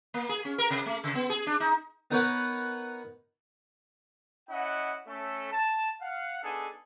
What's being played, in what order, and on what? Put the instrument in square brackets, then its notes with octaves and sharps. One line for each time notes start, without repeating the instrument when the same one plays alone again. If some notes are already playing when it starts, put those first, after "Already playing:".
[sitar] A#3
G#4
C#4
A#4
C3
A3
C#3
B3
G#4
D4
D#4
[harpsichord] B3 D#4 A#4 B4 C#5 F#5
[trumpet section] C#4 E4 D#5 F#5
A3 C#4 A4
A5
F5 F#5
B3 D4 D#4 G#4 A4 G#5